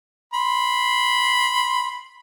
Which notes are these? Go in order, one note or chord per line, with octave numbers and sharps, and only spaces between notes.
B5 C6